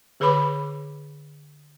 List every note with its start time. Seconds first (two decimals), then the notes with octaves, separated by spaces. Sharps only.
0.20 D3 G#4 B4 C#5 B5 D6